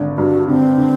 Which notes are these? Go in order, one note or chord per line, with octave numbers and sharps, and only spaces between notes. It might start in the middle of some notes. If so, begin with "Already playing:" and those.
Already playing: G#1 D3
G2 F#4
D3 C4
D3